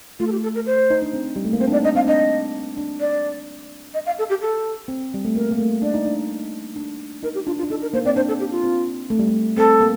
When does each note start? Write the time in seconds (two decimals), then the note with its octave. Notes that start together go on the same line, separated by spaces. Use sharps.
0.19 A3 F4
0.27 A4
0.32 G4
0.43 A4
0.55 A#4
0.66 C5
0.90 D#4
1.02 D4
1.13 C4
1.36 G3
1.45 A3
1.53 A#3
1.60 C4 C5
1.67 D4
1.72 D#4 D5
1.84 D4 D#5
1.95 C4 F5
2.07 D4 D#5
2.77 D4
3.00 D5
3.94 D#5
4.06 F5
4.19 A4
4.30 G4
4.41 A4
4.88 C4
5.14 G3
5.25 A3
5.35 A#3 A#4
5.51 A#3
5.59 A3
5.82 D4 D5
5.94 D#4
6.06 D4
6.76 D4
7.23 D#4 A#4
7.35 G4
7.46 D4 F4
7.58 F4
7.63 D4
7.70 D#4 A4
7.82 A#4
7.93 A#3 C5
8.05 C4 D5
8.16 D4 C5
8.28 A4
8.40 G4
8.51 F4
8.64 C4
9.10 A3
9.19 G3
9.28 A3
9.57 C4 A4
9.81 A#3